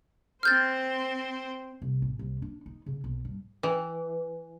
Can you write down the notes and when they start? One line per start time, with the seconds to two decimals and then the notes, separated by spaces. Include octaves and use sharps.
0.43 C4 C5 F6 G6 A6
1.82 C2
2.02 A1
2.19 C2
2.42 D4
2.66 D#4
2.86 C#3
3.04 B1
3.25 G2
3.63 E3